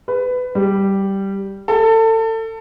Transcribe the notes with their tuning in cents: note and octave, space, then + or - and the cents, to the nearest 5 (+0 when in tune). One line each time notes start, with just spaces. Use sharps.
B4 +20
G3 -5
A4 +30